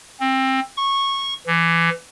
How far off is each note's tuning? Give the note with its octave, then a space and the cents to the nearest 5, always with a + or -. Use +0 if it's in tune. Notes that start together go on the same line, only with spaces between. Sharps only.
C4 +20
C#6 -15
E3 +25